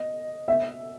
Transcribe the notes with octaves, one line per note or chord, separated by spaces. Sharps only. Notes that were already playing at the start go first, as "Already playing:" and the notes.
Already playing: D#5
E5